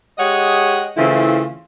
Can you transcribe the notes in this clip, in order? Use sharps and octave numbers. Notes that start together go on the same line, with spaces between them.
G#3 G4 G#4 C#5 D#5 F#5
C#3 E3 A3 C4 E4 F4